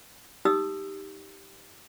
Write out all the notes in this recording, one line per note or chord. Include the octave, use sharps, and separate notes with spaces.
D#4 G4 D#6 E6